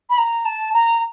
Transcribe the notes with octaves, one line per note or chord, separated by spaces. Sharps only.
B5
A#5
A5
A#5